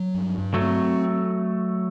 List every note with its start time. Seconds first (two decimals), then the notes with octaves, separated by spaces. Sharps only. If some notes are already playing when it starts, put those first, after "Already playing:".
Already playing: F#3
0.14 G2
0.38 G2
0.54 F#3 A3
0.61 C4